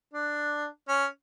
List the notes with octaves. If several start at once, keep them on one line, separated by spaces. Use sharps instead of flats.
D4
C#4